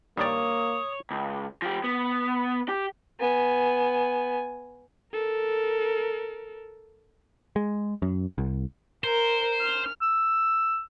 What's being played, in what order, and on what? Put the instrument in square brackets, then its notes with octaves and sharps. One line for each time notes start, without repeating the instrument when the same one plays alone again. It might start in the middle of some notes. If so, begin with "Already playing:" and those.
[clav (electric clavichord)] G2 D#3 D5 [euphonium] A#3 [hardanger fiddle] C#5 [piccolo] D#6
[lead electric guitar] C#2
F3 G4
B3
G4
[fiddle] B3 G#5
[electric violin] A4 A#4
[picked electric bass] G#3
F#2
C2
[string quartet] A#4 [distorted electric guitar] C5
[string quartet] F6
[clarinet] E6